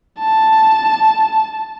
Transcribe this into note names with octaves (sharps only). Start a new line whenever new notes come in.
A5